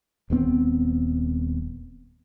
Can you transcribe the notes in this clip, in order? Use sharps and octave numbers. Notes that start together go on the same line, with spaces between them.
D#1 G2 B3 C4